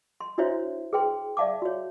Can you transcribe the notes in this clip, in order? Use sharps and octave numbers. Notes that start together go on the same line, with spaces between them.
C6
D4 E4 F#4 C5 C#5 E5
G#4 B4 G5 C6
D5 E5 F5 A5 D6
F#4 C#5